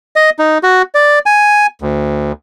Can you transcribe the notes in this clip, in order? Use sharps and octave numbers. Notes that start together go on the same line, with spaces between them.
D#5
D#4
F#4
D5
G#5
D2